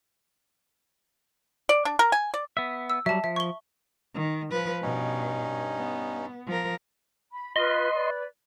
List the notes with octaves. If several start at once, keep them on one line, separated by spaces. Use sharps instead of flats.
D5
D4
A#4
G#5
D5
B3 E5
E6
F#3 G3 E5 A5
F3 E5
C#6 G7
D#3
F3 B4
G2 B2 C#4 D#4
B3
F3 A#4
B5
F4 B4 D#5 C6
B4 D5